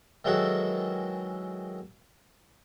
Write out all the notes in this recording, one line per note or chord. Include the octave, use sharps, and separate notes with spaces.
D#3 E3 F#3 G#3 F#4 A4